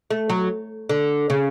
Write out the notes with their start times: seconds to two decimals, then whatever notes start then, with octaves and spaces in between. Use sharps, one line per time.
0.11 A3
0.29 F#3
0.89 D3
1.30 C#3